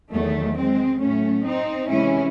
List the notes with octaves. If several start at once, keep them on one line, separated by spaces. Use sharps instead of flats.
E2 D#3 F#3 A3
G#3 C4
A2 F#3 A3 C#4
C4 D#4
C3 E3 G#3 C#4 E4